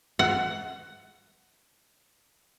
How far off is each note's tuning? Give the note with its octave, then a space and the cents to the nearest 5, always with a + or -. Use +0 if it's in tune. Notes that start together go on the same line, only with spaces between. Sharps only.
F#5 +15